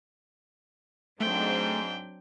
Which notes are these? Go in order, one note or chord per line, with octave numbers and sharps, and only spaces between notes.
G#2 F#3 A3 C4 D4 G5